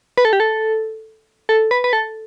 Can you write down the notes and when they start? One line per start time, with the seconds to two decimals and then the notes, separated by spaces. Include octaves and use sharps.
0.18 B4
0.25 A4
0.33 G4
0.40 A4
1.49 A4
1.71 B4
1.84 B4
1.93 A4